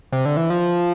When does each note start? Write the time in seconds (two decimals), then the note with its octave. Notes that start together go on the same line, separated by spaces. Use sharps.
0.12 C3
0.25 D3
0.37 E3
0.50 F3